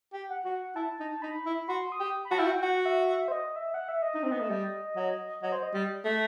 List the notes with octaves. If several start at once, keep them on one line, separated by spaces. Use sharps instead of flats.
G4
F#5
F#4
E4 A5
D#4
D#4 B5
E4
F#4 C6
D#6
G4
B5
F#4 A5
E4 G5
F#4
G5
F#4 F#5
E5
E5
C5
D#5
E5
F#5
E5
D#5
D#4
C4
B3
A3
G3
F#3
F#3 D#5
C5
D#5
G3
A3